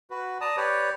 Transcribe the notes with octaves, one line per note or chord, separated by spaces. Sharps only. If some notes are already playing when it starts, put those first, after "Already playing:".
F#4 B4
D5 A5 A#5 D#6
G4 B4 C#5 D5